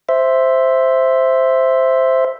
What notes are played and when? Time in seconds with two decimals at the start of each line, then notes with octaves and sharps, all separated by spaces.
0.09 C5 E5